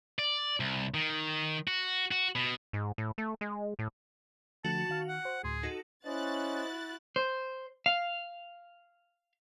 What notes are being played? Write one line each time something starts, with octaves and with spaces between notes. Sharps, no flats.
D5
C2
D#3
F#4
F#4
B2
G#2
A2
A3
G#3
A2
D3 F3 A3 F#4 A5
D#3 F5 F6
F#5
C5
D2 A2 G#4 C6
D#4 F#4 A4
C#4 E4 F#4 C5 D#5 F#6 A6
C5
F5